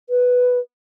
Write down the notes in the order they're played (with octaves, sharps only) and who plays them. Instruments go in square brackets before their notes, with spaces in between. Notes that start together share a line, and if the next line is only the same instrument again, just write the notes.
[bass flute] B4